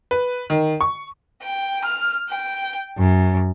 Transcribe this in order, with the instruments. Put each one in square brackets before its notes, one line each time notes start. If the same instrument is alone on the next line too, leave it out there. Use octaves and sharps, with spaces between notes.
[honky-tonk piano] B4
D#3
C#6
[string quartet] G5
F6
G5
F#2